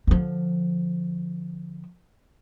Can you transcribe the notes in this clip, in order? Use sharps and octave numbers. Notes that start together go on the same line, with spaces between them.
D3 F3